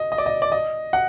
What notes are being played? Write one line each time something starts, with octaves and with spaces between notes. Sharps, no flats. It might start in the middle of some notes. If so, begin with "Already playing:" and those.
Already playing: D#5
D#5
D5
D#5
D5
D#5
F#5